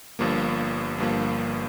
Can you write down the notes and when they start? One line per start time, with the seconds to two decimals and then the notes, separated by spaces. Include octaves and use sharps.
0.19 G1 G2 F3 A#3
0.98 G1 G2 F3 A#3